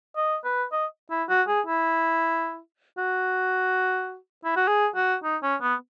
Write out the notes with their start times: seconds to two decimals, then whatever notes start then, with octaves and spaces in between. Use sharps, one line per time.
0.17 D#5
0.45 B4
0.73 D#5
1.10 E4
1.29 F#4
1.48 G#4
1.67 E4
2.98 F#4
4.45 E4
4.56 F#4
4.68 G#4
4.96 F#4
5.24 D#4
5.43 C#4
5.61 B3